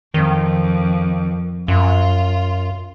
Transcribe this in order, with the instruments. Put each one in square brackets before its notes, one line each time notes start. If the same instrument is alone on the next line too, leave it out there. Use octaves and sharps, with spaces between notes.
[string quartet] F2 [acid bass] D#3
[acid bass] F#2 [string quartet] F4